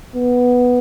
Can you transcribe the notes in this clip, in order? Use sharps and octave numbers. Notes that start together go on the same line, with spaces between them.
B3